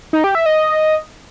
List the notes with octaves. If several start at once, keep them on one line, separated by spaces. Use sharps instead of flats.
D#4
G4
E5
D#5